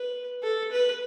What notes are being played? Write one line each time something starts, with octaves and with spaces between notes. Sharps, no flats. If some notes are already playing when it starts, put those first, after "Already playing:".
Already playing: B4
A4
B4